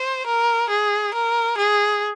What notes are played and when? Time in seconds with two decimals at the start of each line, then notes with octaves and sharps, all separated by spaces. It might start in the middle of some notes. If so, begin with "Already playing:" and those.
Already playing: C5
0.26 A#4
0.69 G#4
1.14 A#4
1.57 G#4